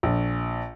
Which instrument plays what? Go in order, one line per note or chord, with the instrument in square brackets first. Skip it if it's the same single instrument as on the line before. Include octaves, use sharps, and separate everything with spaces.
[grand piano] A#1